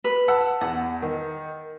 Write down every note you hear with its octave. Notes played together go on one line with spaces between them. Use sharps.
B4
F#5 A5 E6
E2 F#5
D#3